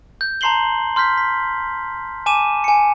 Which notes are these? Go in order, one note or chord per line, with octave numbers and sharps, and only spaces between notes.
G6
A5 A#5 C6 C7 F#7 G7
C6 F6 G6 B6
B6
G#5 A5 D6 D#7 E7
G#5 C#7